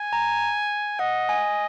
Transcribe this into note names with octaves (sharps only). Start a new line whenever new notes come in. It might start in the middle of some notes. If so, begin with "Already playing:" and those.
Already playing: G#5
A#5
D#5 F#5
G#5